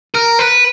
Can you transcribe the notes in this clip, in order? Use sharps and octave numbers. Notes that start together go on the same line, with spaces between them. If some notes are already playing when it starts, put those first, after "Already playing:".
A#4
B4